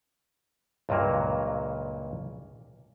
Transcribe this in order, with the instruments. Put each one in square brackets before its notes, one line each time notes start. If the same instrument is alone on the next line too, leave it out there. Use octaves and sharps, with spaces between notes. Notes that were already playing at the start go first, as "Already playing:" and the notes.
[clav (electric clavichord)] C#2 G2 A#2 F#3 A#3